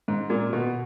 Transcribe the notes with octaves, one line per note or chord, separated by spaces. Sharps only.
G#2
A#2
B2